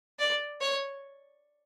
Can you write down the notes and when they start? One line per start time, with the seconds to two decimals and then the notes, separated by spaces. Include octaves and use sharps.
0.19 D5
0.61 C#5